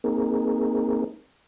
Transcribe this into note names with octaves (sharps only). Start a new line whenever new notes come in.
A#3 C4 D#4 G#4 A#4